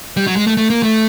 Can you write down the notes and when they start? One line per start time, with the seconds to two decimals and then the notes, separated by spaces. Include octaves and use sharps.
0.17 G3
0.27 F#3
0.36 G#3
0.47 A3
0.57 A3
0.70 A#3
0.83 A3